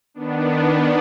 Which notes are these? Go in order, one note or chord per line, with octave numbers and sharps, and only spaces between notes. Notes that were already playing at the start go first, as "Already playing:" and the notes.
D#3 B3 D4